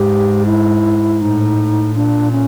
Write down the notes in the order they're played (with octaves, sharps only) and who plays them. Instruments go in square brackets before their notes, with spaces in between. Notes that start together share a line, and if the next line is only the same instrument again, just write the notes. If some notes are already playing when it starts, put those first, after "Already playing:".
Already playing: [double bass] G#2 [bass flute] G4
[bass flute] E4
[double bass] A2 [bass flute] D#4
[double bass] A#2 [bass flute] D4
[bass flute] C#4